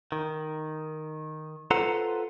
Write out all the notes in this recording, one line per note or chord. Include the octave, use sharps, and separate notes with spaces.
D#3
F4 A4 B4 C5 F#5 A#5